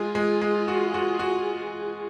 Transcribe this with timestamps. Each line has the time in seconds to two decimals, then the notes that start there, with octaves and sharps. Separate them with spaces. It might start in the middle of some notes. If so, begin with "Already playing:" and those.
Already playing: G#3 F4 G#4
0.15 G#3
0.42 G#3
0.68 F#4
0.94 F#4
1.19 F#4